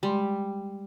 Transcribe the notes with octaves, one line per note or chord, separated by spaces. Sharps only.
G3 G#3 C6